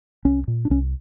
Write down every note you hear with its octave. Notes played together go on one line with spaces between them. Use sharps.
C2 C#4
A#2
D4
C2 C#4